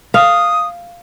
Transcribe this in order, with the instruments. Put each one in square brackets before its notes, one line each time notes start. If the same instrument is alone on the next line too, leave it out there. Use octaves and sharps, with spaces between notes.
[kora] F5 [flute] D#6